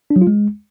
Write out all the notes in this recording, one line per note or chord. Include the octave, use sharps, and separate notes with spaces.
D4
F#3
F4
G#3